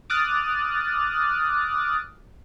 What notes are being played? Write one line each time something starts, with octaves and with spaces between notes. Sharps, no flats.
D6 D#6 F6 F#6 A6